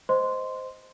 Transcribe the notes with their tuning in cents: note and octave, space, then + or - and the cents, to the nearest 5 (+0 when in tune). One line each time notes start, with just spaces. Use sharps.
C5 -10 D#5 +0 C6 -10